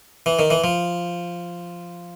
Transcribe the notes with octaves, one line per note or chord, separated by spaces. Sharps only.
E3
D#3
E3
F3